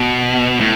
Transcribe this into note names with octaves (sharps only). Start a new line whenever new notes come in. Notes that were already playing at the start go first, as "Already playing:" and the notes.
Already playing: B2
A2